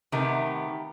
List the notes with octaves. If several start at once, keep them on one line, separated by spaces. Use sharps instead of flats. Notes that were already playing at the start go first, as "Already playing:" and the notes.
C3 D#3 A3 B3 G4